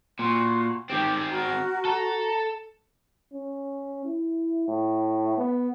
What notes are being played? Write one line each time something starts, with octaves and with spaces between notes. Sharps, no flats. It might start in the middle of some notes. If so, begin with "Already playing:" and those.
A#2 F#4 C6
D#3 C4 G4 G5
F#4 A#4
A4 A#5
C#4
E4
A2
B3